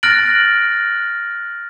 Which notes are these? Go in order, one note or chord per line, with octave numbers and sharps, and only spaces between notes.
F6 F#6 A6 A#6 D7 F#7